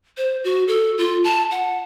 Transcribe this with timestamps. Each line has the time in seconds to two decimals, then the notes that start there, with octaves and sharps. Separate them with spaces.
0.17 C5
0.44 F#4
0.68 A4
0.98 F4
1.24 A5
1.51 F#5